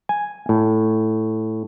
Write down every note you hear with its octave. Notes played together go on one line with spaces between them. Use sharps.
G#5
A2